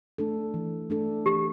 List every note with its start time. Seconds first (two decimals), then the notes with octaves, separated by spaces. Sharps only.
0.18 A3 D4 A4
0.54 E3
0.90 A3 D4 A4
1.26 E3 G4